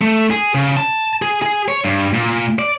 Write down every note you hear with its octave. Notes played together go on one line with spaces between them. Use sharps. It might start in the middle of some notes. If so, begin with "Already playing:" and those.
A3
G#4
C#3
A5
G#4
G#4
C#5
G2
A#2
D5